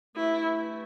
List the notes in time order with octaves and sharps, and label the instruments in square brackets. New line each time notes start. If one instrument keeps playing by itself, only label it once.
[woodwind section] G2 E3 A3 [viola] E4